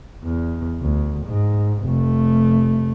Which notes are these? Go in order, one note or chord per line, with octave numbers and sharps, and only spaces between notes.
E2
D2
G#2
F1 A3